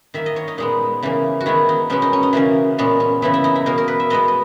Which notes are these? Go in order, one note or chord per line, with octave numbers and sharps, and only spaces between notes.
D#3 A#3 E5
D#5
C#5
D#4
A#2 G#3 B3 D#4
C#3 E3 A#3
F#4
D#3 G#3 B3 E4
D#4
B2 G#3 B3 C#4
D#4
C#4
D#4
C#3 E3 A#3 C#4
A#2 G#3 B3 C#4
C#4
C#3 E3 B3 E4
E4
D#4
E4
B2 A#3 A#4
A#4
B4
E5
B2 G#3 B3 D#5
D#5